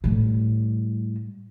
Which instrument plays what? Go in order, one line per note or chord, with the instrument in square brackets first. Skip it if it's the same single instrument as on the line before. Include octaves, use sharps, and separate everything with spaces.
[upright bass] A2 G3